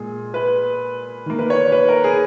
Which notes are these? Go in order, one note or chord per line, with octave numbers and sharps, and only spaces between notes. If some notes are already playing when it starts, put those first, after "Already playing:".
Already playing: A#2 G#3 G#4
B4
D#3 A#3
B4
C#5
B4
A#4
G#4